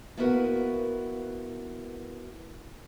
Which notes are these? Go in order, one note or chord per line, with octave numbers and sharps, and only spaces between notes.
A#3 B3 E4 F#4 A#4 B4